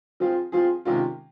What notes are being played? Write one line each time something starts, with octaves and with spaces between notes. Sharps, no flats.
F3 C4 F4 G#4
F3 C4 F4 G#4
C3 D#3 G#3 C#4 F4